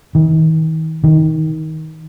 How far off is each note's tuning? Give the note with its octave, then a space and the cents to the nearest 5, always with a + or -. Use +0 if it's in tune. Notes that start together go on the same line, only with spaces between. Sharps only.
D#3 +45
D#3 +20